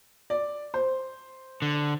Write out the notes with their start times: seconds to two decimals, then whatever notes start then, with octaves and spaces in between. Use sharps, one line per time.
0.30 D5
0.74 C5
1.62 D3